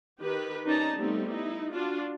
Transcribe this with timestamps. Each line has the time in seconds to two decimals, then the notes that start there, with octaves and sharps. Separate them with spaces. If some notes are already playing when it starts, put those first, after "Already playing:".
0.20 D#3 G4 B4
0.66 C#4 D#4 D5 A5 A#5
0.97 G3 A3 B3 C4 D#4
1.30 D#4 E4
1.72 D4 F4 F#4